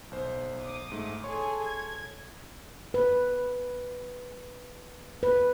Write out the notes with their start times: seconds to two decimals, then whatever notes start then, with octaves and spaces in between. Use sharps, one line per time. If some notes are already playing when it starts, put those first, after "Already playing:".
0.11 B1 C5
0.58 D6 D#6
0.92 G#2 A3
1.24 G#4 A4 C#5 G#5 C6 C#6
1.62 G#6
2.94 B4
5.23 B4